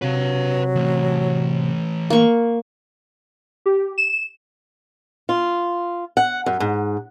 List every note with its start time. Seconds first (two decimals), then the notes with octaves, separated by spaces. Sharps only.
0.02 C3 F#3 B4 F5
0.75 E3 A3
2.10 A#3 C#6
3.66 G4
3.98 E7
5.29 F4
6.17 F#5
6.46 F#2
6.60 G#2